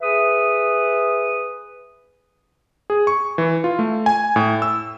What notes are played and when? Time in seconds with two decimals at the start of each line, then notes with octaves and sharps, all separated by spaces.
0.01 G#4 B4 E5 D#6
2.90 G#4
3.07 C#6
3.38 E3
3.64 F4
3.79 A3
4.06 G#5
4.36 A2
4.62 E6